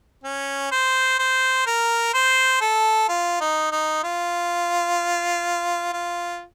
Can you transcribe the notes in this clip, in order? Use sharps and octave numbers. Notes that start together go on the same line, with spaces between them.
C#4
C5
C5
A#4
C5
A4
F4
D#4
D#4
F4
F4